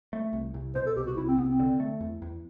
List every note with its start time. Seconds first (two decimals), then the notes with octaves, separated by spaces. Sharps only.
0.13 A3
0.33 C2
0.54 C2
0.75 B2 C5
0.86 A4
0.96 C2 G4
1.06 F#4
1.17 C2 E4
1.28 C4
1.38 C2 B3
1.49 C4
1.60 D3
1.80 A3
2.01 E2
2.22 E2